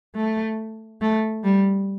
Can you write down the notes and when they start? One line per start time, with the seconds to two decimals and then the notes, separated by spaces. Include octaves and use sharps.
0.16 A3
1.02 A3
1.44 G3